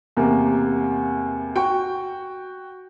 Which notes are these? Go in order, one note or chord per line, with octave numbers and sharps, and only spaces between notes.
E2 C3 A#3
F#4 G5 C#6